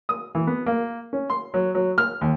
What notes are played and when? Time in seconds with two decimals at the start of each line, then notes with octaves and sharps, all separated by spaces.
0.09 D#6
0.35 E3
0.47 B3
0.66 A#3
1.13 C#4
1.30 C6
1.54 F#3
1.75 F#3
1.98 F6
2.21 D#2